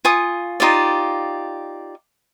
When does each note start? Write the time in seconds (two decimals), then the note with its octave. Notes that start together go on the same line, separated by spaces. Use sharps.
0.05 F4 G#5 C#6 D#6
0.60 D#4 F4 G4 D5